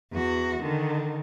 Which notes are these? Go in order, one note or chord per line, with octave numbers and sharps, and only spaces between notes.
E2 F#4
D3 D#3